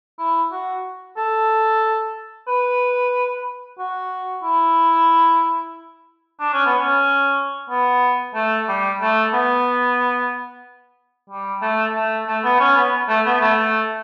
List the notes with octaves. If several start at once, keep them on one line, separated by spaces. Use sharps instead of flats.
E4
F#4
A4
B4
F#4
E4
D4
C#4
B3
C#4
B3
A3
G3
A3
B3
G3
A3
A3
A3
B3
C#4
B3
A3
B3
A3
A3